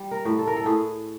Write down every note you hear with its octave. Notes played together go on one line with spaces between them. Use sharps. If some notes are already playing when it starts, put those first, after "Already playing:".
Already playing: G3
A#4
A2
A4
A#4
A4
A2 G#4